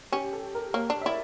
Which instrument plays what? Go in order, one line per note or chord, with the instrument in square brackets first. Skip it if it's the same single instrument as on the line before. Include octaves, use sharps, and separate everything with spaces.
[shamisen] C#4 [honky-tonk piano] G4
[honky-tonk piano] A4
A#4
[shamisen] A#3 [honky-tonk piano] C#5
[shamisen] D4
[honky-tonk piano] E5
[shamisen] E4 [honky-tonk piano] D5